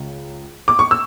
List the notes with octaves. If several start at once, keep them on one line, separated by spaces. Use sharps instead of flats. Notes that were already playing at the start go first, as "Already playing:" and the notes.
Already playing: C#2 C#3
D6
C#6
E6